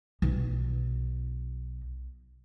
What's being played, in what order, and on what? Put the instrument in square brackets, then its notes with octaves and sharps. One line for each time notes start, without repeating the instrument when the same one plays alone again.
[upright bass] B1 D#4